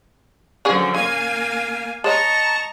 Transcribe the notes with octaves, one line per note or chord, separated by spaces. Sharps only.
D3 F3 F#3 C#4 G#4 B4
C#3 A#3 F5 G#5
G#3 C#5 D#5 A5 A#5 C#6